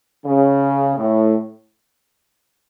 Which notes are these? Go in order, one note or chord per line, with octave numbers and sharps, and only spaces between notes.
C#3
A2